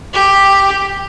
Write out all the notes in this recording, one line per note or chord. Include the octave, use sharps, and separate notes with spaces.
G4